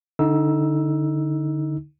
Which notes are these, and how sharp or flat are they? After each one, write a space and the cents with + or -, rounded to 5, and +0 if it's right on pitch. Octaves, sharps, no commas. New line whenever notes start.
D3 +0 D#4 +25 E6 +0